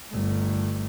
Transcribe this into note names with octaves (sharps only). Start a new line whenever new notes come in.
G1 A3